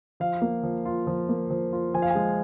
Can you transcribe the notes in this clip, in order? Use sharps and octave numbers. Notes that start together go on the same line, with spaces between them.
F3 F5
A#3
F3
F4
F3
A#3
F3
F4
F3 G#5
F5
G#3 G#5